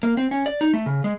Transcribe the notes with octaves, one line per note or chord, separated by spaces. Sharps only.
A#3
C4
C#4
D5
D#4
A3
C#3
G#3